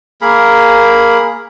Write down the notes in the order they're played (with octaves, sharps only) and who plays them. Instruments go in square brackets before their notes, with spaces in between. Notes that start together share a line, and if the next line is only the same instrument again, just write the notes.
[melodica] A#3 G#4 A#4 B5